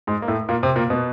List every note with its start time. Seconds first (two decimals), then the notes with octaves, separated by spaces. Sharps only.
0.07 G#2 G#3
0.22 A#3
0.28 A2 A3
0.49 A#2 A#3
0.63 C3 C4
0.76 A#2 A#3
0.90 B2 B3